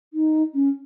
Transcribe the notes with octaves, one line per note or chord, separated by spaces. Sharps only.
D#4
C#4